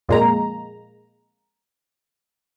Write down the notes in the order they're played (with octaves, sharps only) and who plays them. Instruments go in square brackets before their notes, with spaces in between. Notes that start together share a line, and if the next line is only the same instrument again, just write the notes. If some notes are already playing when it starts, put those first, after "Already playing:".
[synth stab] F2 A#2 G#3 A#3 A#5